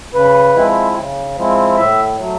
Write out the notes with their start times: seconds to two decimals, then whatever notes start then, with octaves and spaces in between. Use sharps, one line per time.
0.14 C#3 B4
0.55 F3 G#3 C4 E4
0.96 C#3
1.36 F3 G#3 C4 E4
1.76 A2 E5
2.18 F#3 A3